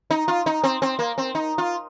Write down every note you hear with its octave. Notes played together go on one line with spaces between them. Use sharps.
D#4
F4
D#4
C4
C4
A#3
C4
D#4
F4